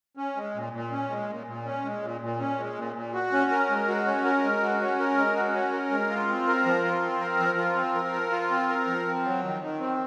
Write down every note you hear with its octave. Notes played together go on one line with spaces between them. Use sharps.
C#4
G#3
A#2
A#2
C#4
G#3
A#2
A#2
C#4
G#3
A#2
A#2
C#4
G#3
A#2
A#2
F#4
C#4
A#4
G#3
F#4
C#4
A#4
G#3
F#4
C#4
A#4
G#3
F#4
C#4
A#4
G#3
F4
C4
A#4
F3
F4
C4
A#4
F3
F4
C4
A#4
F3
F4
C4
A#4
F3
C4
F#3
D#3
D#3
C4